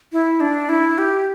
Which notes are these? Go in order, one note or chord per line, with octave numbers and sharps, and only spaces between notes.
E4
D4
E4
G4